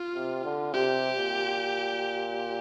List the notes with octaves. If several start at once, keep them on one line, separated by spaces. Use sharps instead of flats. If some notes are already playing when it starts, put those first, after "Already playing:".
Already playing: F4
C3
D3
C3 G4
A#2